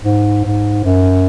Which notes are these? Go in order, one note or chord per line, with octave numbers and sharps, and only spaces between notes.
G#2
G#2
F#2